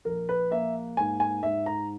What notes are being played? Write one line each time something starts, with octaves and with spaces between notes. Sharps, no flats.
A#1 A#4
B4
A#3 E5
G#2 G#5
G#5
G#2 E5
A#5